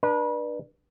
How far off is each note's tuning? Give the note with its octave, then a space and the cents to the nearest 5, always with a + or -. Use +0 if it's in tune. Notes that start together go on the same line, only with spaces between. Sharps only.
D4 +25 B4 -30